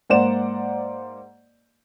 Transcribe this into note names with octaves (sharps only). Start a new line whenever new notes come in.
G#2 A#3 C5 D5 F#5 E7